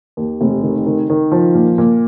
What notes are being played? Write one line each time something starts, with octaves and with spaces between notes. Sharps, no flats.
D#2
F1
D#3
D#3
D#3
F3
A#2
A#2